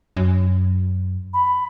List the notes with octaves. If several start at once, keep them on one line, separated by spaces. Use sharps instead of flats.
F#2
B5